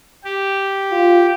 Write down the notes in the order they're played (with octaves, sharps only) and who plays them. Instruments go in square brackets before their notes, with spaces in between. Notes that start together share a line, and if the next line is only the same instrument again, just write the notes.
[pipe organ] G4
[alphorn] F4